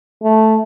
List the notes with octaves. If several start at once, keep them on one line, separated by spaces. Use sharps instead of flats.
A3